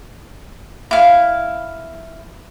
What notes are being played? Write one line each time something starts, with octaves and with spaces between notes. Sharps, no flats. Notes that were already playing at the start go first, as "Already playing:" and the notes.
E4 F5